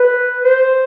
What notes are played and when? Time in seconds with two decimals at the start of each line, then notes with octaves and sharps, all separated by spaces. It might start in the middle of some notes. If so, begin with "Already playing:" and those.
Already playing: B4
0.44 C5